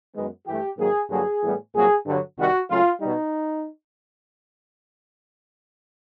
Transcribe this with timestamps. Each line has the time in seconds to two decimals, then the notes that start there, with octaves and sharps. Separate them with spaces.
0.15 F#2 D#3 G#3 B3
0.46 G2 E3 A3 G4
0.78 G#2 D#3 F#3 A#3 G#4
1.10 G2 D3 F#3 A#3 G#4
1.42 A2 E3 G3 B3
1.74 C2 A#2 F#3 A#3 G#4
2.05 G2 D3 F#3
2.37 C2 C3 D#3 G3 F#4
2.68 C#2 C#3 F#3 A3 F4
3.00 B2 G3 D#4